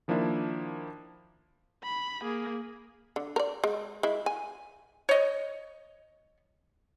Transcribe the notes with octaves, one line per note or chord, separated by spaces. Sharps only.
D#3 F3 A#3 D4 E4
B5
A#3 G#4
D3
A#4 D5
G#3
G#3 E4
G#5
C#5 D#5